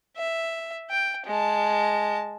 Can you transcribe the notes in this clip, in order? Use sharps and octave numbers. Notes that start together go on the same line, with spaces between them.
E5
G5
G#3 A5